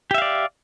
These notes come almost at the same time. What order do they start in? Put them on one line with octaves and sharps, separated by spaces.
G4 E5 F5 D5